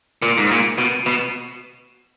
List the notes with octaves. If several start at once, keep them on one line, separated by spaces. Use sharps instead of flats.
A#2
G#2
A#2
B2
B2